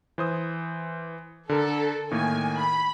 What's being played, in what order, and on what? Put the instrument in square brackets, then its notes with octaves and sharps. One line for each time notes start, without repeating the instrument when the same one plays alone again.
[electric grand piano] E3 C5 D#6
[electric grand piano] D3 A#4 [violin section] A4
[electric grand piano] A2 D#3 A#3 [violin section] G#5
[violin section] B5